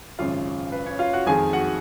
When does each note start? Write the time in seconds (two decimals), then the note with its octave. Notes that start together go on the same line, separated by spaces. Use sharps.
0.19 G#1 F#2 C#3 F4 F5
0.72 B4
0.86 C#4 C#5
0.99 F4 F5
1.13 F#4 F#5
1.26 F2 D#3 G#3 G#4 G#5
1.53 F#4 F#5